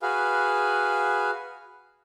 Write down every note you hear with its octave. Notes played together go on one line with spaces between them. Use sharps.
F#4 G#4 B4 F5